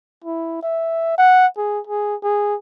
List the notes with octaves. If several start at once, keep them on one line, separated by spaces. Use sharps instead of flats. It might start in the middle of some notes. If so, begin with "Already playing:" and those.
E4
E5
F#5
G#4
G#4
G#4